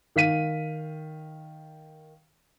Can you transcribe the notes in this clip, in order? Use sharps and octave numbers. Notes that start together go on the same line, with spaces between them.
D#3 F5 B6 D#7